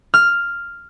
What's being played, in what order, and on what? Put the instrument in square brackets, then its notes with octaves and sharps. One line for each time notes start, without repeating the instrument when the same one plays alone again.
[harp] F6